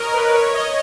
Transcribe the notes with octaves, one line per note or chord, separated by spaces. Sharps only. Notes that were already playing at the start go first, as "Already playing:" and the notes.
Already playing: A#4 C#5 D#5
B4
C#5
D#5